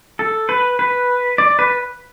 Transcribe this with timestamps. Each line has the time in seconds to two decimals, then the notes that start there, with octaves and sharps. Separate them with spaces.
0.19 A4
0.49 B4
0.79 B4
1.38 D5
1.59 B4